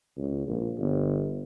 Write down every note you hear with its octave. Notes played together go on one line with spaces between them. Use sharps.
C#2
A#1
G1